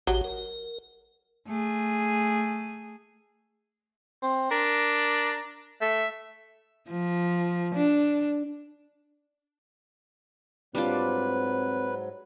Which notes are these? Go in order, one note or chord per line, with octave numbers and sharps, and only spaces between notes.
A1 F#3 F#4 G4
A#4
A3 G#4
C4
D4 A#4
A3 E5
F3
D4
G#2 F#3 G3 C4 D4 F4 B4